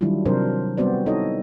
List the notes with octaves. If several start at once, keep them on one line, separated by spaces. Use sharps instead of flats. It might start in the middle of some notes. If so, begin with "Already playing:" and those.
D#3 F#3 G3 D4 E4 F4
C3 F#3 C4 D4 A#4 C5
G3 B3 C4 F#4 C5 D5
D#4 E4 A4 C#5 D#5